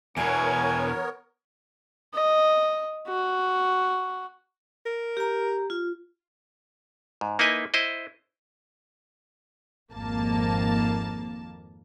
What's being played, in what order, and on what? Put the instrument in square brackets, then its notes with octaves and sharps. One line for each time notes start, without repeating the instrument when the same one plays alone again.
[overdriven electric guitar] E2 B2 [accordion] B3 A#4 C#5 [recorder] G#5
[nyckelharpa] D#5
F#4
[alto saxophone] A#4
[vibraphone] G4 A#5
F4
[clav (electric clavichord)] G#2
A#3 D#4 E4 B4 D#5 G#5
E4 C5 D#5
[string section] G#1 F2 A#3 A5